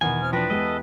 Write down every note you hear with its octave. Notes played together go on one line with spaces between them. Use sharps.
E2 B2 D#3 F#5 G#5
C4 F6
F3 D4 B4 G5 A#6
G#3 B3 G4 A4 D#5